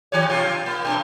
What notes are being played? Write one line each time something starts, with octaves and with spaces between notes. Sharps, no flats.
D#3 G4 C#5
B2 F4 G4
A#3
G2 B2